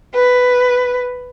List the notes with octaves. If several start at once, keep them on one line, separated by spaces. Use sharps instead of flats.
B4